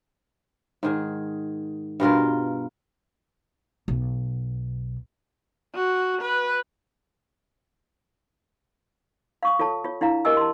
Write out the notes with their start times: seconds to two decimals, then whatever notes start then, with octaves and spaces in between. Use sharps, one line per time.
0.83 G#2 D#3 G#4
2.00 G2 B2 F4 A#4
3.88 B1
5.75 F#4
6.22 B4
9.43 F5 C#6 D#6
9.59 F4 A4 C#5 A5
9.84 F4 C#5
10.01 D4 E4 F5 A#5
10.25 G4 A#4 D#5 G#5 E6
10.37 A5 C6